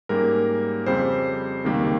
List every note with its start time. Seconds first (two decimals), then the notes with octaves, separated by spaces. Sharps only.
0.09 G#2 G3 A#3 C#4 A#4
0.86 F2 C#3 G3 C4 C5
1.65 C#2 C3 D#3 G3 A#3